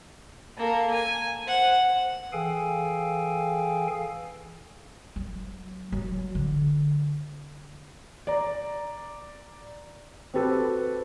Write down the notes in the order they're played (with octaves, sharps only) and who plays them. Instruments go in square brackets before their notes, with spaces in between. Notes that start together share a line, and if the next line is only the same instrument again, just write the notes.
[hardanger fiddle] A#3 A4
G#5
C5 F#5
[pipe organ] E3 G#4 A4 F5 G5 G#5
[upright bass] F#3
F#3
D3
[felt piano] D5 A#5
C4 F#4 G4 A4 B4